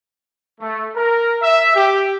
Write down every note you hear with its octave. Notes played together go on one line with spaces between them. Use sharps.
A3
A#4
E5
G4